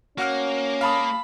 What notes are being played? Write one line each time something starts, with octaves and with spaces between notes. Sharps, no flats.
A#3 C#4 F#4 F#5 F6
F5 A5 B5 D#6